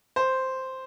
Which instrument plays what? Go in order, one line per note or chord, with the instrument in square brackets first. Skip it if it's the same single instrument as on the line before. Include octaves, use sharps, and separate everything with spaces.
[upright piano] C5